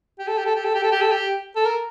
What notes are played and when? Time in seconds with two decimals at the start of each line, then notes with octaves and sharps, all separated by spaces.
0.19 G4
0.28 A4
0.38 G4
0.46 A4
0.55 G4
0.65 A4
0.74 G4
0.83 A4
0.92 G4
1.01 A4
1.11 G4
1.56 A4
1.65 A#4